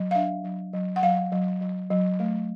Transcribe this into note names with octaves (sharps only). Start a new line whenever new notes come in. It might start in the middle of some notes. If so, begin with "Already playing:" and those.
Already playing: F#3
F5
D4 E5
F#3
F#3
F#5
F#3 F5
F#3
F#3
F#3
A3